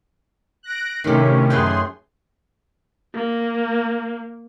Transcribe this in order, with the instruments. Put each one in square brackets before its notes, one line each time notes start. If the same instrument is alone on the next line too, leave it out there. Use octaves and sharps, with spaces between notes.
[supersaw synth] F#6 A#6 D7
[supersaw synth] A2 C3 C#4 [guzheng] D#3 G4
[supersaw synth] F#2 G#4 C6 [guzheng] A3 B4 G5
[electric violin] A#3